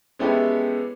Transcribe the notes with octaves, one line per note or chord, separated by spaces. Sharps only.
G#3 B3 C#4 E4 G4 A4